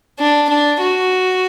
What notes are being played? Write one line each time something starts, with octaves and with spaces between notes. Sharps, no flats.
D4
D4
F#4